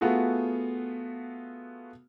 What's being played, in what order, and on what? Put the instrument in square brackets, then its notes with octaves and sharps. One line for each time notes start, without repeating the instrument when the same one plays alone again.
[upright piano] A3 B3 F4 F#4 G#4